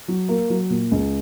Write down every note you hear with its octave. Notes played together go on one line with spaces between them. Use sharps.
F#3
A#3
F#3
A#2
C#2